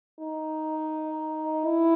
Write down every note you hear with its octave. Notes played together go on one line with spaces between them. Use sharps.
D#4
E4